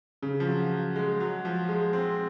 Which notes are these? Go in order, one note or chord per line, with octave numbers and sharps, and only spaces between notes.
C#3
F3
F#3
F#3
G#3
F#3
F3
G#3
C4